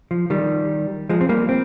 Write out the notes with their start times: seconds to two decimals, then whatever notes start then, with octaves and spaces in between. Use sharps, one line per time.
0.11 F3
0.30 D#3 G3
1.09 F3 G#3
1.21 C4
1.29 G3 A#3
1.49 C4